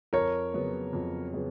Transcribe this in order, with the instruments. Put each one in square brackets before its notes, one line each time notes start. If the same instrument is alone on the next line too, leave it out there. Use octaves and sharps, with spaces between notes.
[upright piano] F2 [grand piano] A#4 C#5
[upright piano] C#3 F#3 B3
F2
C#3 F#3 B3